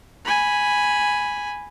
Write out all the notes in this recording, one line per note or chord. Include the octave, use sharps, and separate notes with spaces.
G#5 B5